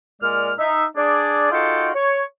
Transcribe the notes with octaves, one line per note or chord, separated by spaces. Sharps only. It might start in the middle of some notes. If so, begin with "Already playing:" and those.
A#2 G#3 D5 F6
D#4 E5
D4 G#4 D5
D#4 F4 F#4 G#4 A4 G5
C#5